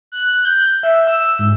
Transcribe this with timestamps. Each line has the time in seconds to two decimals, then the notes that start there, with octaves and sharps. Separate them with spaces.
0.12 F#6
0.45 G6
0.83 E5
1.07 E6
1.39 G#2